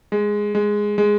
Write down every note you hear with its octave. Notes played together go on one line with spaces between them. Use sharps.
G#3
G#3
G#3